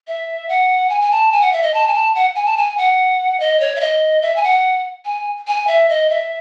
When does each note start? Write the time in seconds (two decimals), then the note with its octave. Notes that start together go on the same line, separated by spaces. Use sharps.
0.08 E5
0.49 F#5
0.89 G#5
1.01 G#5
1.11 A5
1.32 G#5
1.41 F#5
1.53 E5
1.62 D#5
1.74 A5
1.87 G#5
1.94 A5
2.15 F#5
2.36 G#5
2.46 A5
2.57 G#5
2.78 F#5
3.40 D#5
3.60 C#5
3.76 E5
3.80 D#5
4.22 E5
4.36 G#5
4.43 F#5
5.05 G#5
5.47 G#5
5.67 E5
5.89 D#5
6.10 E5